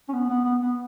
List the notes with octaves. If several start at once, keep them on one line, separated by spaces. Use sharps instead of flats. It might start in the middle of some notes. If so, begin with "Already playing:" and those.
C#4
B3
B3
B3
B3